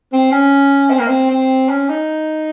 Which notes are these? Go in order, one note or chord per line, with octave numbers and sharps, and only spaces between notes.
C4
C#4
C4
A#3
C4
C4
C#4
D#4